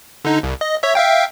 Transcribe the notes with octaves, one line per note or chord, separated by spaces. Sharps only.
D3 D#4
C2
D#5
C#5 E5
E5 F5 G5